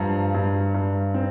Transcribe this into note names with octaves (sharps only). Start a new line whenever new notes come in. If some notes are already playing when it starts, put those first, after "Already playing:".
Already playing: G2 F3 A#5
G2
G2
C4